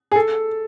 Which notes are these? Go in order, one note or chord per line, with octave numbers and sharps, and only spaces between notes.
G#4
A4